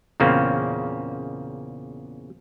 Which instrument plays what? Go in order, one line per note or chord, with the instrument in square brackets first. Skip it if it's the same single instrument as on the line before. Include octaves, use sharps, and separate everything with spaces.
[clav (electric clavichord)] E2 A#2 C#3 A#3 C4